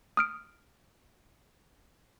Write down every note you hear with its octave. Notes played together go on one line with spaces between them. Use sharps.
D#6 F6 D7